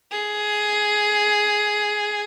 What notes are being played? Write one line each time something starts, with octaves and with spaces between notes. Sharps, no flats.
G#4